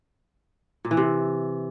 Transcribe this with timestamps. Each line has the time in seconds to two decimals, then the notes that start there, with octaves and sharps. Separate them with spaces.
0.85 A#2
0.91 E3
0.97 C3